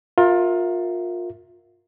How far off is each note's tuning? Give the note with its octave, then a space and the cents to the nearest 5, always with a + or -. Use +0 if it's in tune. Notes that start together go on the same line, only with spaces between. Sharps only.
F4 +25 A#4 +0 E5 +0